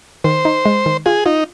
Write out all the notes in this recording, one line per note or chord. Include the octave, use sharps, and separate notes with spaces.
D#3 C5
D#4
G#3
D#3
F4 G#4
D#4 F4